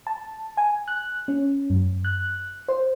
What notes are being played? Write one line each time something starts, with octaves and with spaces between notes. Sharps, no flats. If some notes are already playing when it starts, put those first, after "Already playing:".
A5
G#5
F#6
C#4
F#2
F#6
C5